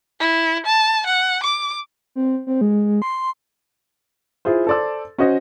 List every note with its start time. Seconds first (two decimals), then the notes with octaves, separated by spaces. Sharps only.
0.20 E4
0.66 A5
1.06 F#5
1.43 D6
2.16 C4
2.47 C4
2.61 G#3
3.02 C6
4.45 E4 F4 G#4 C5
4.67 A4 C5 D5 C6 E6
5.18 C#4 F#4 C5 D#5